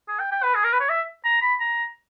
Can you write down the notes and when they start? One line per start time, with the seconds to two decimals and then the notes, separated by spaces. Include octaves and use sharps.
0.08 G#4
0.20 G5
0.32 G5
0.43 B4
0.55 G#4
0.64 A#4
0.73 B4
0.80 C#5
0.89 E5
1.25 A#5
1.42 B5
1.60 A#5